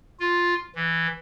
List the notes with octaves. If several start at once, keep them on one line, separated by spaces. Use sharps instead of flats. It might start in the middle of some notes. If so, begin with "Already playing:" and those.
F4
E3